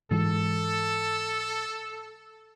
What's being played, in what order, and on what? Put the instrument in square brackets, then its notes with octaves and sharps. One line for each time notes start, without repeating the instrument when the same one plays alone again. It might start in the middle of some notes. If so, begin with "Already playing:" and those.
[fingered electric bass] G#2 E3 G#3 [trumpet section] A4